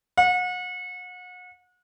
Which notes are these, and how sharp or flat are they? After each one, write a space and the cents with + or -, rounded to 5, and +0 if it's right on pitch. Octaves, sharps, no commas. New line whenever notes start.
F#5 -35